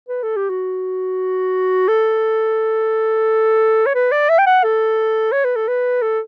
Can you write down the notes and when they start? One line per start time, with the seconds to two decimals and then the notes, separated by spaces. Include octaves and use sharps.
0.09 B4
0.23 A4
0.36 G4
0.50 F#4
1.88 A4
3.86 C#5
3.95 B4
4.12 D5
4.29 E5
4.39 G5
4.46 F#5
4.63 A4
5.32 C#5
5.45 B4
5.56 A4
5.68 B4
6.02 A4